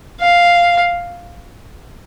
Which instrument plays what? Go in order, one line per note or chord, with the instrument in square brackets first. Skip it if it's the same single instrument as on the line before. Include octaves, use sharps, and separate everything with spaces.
[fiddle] F5